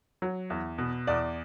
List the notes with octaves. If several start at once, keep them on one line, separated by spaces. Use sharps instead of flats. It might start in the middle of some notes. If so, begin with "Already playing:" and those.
F#3
E2
B2
E2 D5